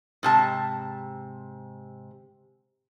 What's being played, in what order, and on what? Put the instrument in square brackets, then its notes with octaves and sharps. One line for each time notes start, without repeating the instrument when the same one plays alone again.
[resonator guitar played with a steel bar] G#2 C3 A5